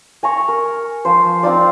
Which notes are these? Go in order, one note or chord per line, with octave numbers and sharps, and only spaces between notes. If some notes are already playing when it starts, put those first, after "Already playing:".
G#5 A#5 C#6
A#4
F3 C5
C4 D#4 F4 D5